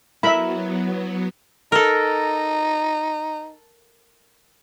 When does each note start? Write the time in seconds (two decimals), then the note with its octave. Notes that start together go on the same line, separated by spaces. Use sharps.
0.23 F#3 B3 E4 A#4 B4 E5 B5
1.72 D#4 A4 A#4